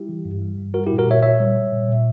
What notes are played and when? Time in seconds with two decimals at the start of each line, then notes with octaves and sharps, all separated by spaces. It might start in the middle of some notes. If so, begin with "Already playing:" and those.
Already playing: G3 E4 G4
0.09 E3
0.25 G2
0.41 G3
0.58 G2
0.74 G3 F#4 A#4
0.87 A#2 E4 G4
0.98 F#4 A#4
1.07 A#2 C#5 E5
1.22 A#2 C#5 E5
1.40 G3
1.55 G3
1.72 A#2
1.88 A#2